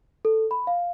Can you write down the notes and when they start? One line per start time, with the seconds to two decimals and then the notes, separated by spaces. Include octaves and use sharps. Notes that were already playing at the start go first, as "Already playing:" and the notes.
0.25 A4
0.51 B5
0.67 F5